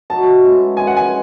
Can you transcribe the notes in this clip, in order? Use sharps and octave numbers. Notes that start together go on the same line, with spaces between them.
F#3 A3 D#4 F#4 A5
B2 G#3 C#4 E4
D#3 G#3 B3 G#5
F#5
G#5